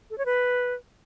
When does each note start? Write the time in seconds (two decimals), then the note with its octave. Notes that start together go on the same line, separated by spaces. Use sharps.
0.10 A4
0.18 C#5
0.26 B4